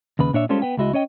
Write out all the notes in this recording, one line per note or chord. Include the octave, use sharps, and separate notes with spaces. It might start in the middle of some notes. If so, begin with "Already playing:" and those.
D#2 C#3 B4
A#2 D4 C#5 E5
G3 G#3 C#4 F4 A4 C5
B3 B4 G5
C#2 G#3 E4 F#4 D#5
C#4 C#5 D#5 G5